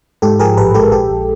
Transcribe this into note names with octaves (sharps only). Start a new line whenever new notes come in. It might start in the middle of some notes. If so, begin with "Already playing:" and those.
G#2 G4 A4
F3 G#4 A#4
A1 A4 B4
G#3 G4 A4
A#1 G4 A4
A#1